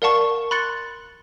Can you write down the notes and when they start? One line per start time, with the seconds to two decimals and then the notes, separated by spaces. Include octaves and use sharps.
0.02 A#4 D5 F5 F#5 A5 C#6
0.51 B5 C6 F#6 A6 C#7